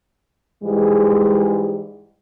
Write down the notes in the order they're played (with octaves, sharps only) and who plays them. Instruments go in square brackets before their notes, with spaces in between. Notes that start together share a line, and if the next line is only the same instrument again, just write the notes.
[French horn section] G#2 E3 G3 G#3